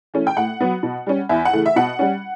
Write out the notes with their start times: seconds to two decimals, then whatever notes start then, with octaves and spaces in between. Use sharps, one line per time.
0.14 E3 A3 C#4
0.27 G5
0.37 A2 F#5
0.60 F#3 B3
0.83 B2
1.07 G3 C#4
1.29 E2 E5
1.45 F#5
1.53 C#3 E3 A3
1.66 E5
1.76 B2 F#5
1.99 G3 C#4